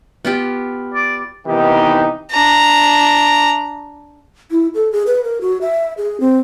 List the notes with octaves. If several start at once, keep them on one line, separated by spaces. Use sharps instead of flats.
B3 F4 G4
D5
C3 D#3 E3 B3 D#4 G4
D4 A#5
E4
A4
G#4
B4
A#4
F#4
E5
G#4
C4